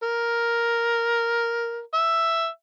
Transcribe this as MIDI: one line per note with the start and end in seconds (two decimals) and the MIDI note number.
0.03 1.79 70
1.93 2.47 76